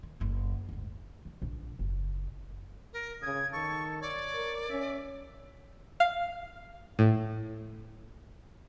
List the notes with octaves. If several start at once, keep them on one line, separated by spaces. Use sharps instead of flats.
D#3
F#1 D2
D2 G#2
E3
A#1
F#1
A#4
C#3 D#6 G#6
D#3 A4 C#6
C#5 D5
A#4
C#4 E5
F5
A2